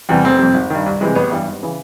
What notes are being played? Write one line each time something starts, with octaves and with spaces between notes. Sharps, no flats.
E2 C3 E3 G3
F1 C4
F2 C3
G#1
G2 D#3
C2
C3 E3 G#3
A1 B3
G2 E3 G3
G#1
C#3 E3